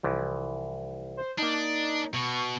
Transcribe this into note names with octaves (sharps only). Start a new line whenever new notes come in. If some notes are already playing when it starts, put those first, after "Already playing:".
C2 E3 F3
C5
A#3 D4 D#4 A5
B2 C#6